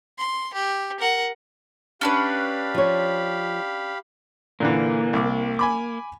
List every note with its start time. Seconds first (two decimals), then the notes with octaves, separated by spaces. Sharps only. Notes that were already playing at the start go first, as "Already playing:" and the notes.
0.18 C6
0.54 G4
1.00 A#4 F#5
2.01 C#4 D4 G4 B4 F5 B5
2.74 F3 C#5
4.60 A#2 D3 E3 A#3
5.13 C2 D6
5.59 G#5 B5 D6